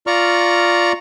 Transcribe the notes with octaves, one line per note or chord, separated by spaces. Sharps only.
F4 D5 A#5 C#6 F6